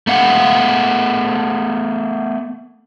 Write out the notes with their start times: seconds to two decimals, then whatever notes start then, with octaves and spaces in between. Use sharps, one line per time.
0.07 A3 B3 F5 F#5